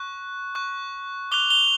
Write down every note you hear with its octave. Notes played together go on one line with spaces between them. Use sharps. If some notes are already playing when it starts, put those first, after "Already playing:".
Already playing: C#6 F#6
C#6 F#6
D6 F#6 F7 G7
F7 G7